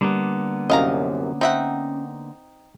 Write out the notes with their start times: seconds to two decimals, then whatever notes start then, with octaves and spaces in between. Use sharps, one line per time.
0.01 D3 G3 A#3 B3
0.70 C2 F#2 C#4 D#5 F5 A#5
1.41 C4 D#4 E5 F#5